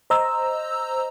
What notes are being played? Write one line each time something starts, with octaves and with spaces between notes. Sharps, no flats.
C5 D#5 A#5 E6